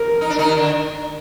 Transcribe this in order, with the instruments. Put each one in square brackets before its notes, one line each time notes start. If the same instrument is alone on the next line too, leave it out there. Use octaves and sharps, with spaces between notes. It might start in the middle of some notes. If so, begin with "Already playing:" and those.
Already playing: [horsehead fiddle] A#4
[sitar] D#4
D4
D#3 D#4
D3 D4